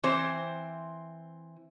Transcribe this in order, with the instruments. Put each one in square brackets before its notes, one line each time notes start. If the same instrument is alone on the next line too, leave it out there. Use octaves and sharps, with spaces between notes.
[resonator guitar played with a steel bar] E3 C4 C5